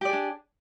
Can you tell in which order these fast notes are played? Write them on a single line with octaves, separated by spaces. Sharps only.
G4 D5 G#4 D4